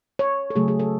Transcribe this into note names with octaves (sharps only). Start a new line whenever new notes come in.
C#5
A4
C#3 F#3 A3 G#4
G#4
A4